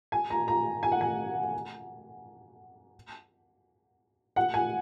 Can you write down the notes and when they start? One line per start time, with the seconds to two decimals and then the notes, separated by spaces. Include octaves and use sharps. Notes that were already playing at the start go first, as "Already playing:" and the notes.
0.12 G#5
0.30 A#5
0.48 A#5
0.83 G#5
0.92 F#5
1.01 G#5
4.36 F#5
4.54 G#5